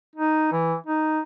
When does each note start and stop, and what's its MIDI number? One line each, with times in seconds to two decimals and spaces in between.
0.16 0.51 63
0.52 0.75 52
0.86 1.20 63